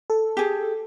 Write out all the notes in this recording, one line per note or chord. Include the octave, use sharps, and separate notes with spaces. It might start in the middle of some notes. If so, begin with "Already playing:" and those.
A4
G4 G#4